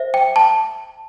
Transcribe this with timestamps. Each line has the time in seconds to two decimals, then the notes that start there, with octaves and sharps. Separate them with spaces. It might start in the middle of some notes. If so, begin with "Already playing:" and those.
Already playing: C5 E5
0.14 G5
0.36 A5